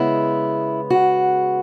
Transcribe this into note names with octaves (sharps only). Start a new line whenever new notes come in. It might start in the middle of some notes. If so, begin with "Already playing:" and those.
Already playing: C#3 G#3 B3 E4
F#4